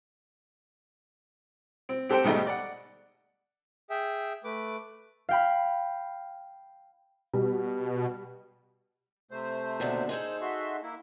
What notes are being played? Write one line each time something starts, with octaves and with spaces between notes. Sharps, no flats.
C4
C4 G4 A4 C5 G5
G#2 B2 D#3 G3 A3 D#5
D5 F#5
G#4 E5 G5
A3 B4 D6
F5 G5 B5
B2 G3
C3 A3 C5
D#2 B2 D3
D#4 G#4 A4 C5
F#4 E5 C6
A#3 E4